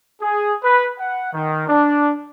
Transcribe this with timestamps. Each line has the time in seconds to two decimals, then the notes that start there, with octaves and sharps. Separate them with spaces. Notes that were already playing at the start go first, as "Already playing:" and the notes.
0.22 G#4
0.64 B4
0.99 F#5
1.34 D#3
1.68 D4